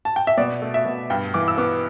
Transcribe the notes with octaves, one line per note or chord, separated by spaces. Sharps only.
A5
G5
E5
B2 D5
A3
E5
B2
G2 G5
E3 D6
E6
B3 D6